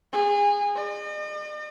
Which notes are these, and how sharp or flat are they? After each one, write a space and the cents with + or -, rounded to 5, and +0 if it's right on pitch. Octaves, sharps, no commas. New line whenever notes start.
G#4 -25
D#5 -45